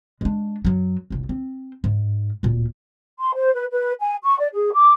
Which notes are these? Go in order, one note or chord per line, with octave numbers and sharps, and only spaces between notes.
G#3 D4
F#2 F#3
F1 C2
C4
G#2
D1 A#2
C6
C5
B4
B4
G#5
C#6
D5
G#4
D6